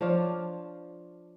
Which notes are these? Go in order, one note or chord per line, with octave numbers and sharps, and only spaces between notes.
F3 D4 F4 C#5